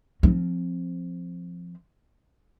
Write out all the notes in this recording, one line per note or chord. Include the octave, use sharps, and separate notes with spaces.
F3 C4